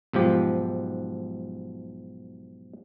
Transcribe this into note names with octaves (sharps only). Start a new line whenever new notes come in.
B1 G#2 F3 G4